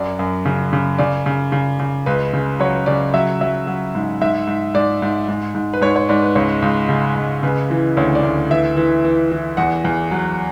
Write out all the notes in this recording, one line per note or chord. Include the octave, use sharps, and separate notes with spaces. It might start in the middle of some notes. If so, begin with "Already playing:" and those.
Already playing: F#2 F#3 D5
F#2
C#3
C#3
C#3 D5
C#3
C#3
C#3
C#2 B4
C#3
F#3 C#5
C#3 D5
F#3 E5
F#3 E5
F#3
G#2
G#2 E5
G#2
G#2 D5
G#2
G#2
G#2
B4
G#2 C#5
C#5
G#2 D5
B4
C#2 C#5
C#2
C#3
C#2
C#3 B4
E3
D2 C#5
D5
D2
E3 E5
E3
E3
E3
E2 F#5
E2
F#3